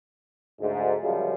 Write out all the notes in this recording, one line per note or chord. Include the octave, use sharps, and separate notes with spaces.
D2 G#2
F#2 C#3 F3 G3 G#3